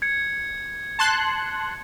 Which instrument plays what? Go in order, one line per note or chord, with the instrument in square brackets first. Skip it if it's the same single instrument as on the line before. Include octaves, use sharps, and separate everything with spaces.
[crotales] G#6 C#7
[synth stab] A5 C6 F#6